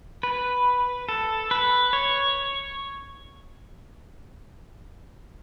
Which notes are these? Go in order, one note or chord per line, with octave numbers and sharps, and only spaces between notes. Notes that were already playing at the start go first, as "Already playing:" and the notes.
B4
A4
B4
C#5